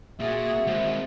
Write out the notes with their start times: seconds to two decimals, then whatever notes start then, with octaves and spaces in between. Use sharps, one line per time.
0.19 A#2 F#4 G#4 E5
0.67 G#3 C4